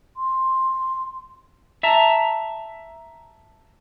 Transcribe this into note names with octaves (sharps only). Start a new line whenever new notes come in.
C6
E5 A5 A#5